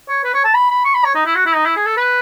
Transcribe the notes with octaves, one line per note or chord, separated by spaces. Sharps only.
C#5
B4
C#5
A5
B5
B5
C#6
B5
C#5
D#4
E4
F#4
E4
D#4
E4
G#4
A4
B4